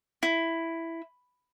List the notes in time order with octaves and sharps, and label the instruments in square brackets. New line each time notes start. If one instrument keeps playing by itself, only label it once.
[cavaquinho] E4